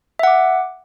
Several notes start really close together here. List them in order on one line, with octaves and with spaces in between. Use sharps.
E5 F#5 D6